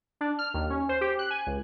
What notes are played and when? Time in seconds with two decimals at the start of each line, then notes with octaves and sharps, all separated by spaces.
0.21 D4
0.39 F6
0.54 D#2
0.70 C#4
0.89 C5
1.01 G4
1.19 F#6
1.30 G#5
1.47 C#2